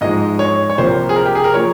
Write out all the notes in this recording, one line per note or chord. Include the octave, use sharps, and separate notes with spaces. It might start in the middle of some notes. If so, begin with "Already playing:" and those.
G#2 F3 G#3 D#5
C#5
C#5
C2 C3 F3 A#3 C5
G#4
A#4
G4
G#4
A#4
F3 A#3 C#5